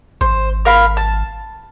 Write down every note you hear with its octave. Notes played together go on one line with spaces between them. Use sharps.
G#1 C5
A#4 F5 B5
A5